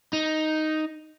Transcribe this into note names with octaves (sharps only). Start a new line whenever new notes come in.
D#4